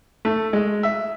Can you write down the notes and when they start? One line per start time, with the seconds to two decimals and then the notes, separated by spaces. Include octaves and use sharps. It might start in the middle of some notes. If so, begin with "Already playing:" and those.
0.25 A3
0.53 G#3
0.83 E5